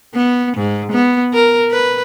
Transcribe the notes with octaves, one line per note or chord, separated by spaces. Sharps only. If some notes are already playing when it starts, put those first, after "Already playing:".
B3
G#2
B3
A#4
B4